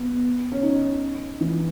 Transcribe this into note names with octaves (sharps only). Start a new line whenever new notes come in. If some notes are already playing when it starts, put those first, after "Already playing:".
Already playing: B3
C#4
D#4
E3